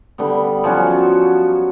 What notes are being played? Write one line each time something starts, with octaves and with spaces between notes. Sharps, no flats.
D3 G3 B3
F3 F#3 C#4 F#4